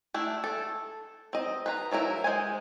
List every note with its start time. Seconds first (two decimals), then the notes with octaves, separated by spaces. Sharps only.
0.14 A3 D4 E4
0.44 A4
1.33 C4 D#5
1.66 B4 C5 A#5
1.91 F3 F#3 E4 A#4
2.24 G#3 C5 G#5